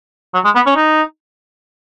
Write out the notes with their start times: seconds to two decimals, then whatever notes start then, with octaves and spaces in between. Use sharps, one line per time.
0.34 F#3
0.45 G#3
0.55 B3
0.66 C#4
0.76 D#4